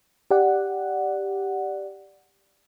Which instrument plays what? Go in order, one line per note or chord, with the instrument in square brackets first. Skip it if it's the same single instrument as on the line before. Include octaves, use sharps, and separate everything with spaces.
[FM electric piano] G4 D5 F#5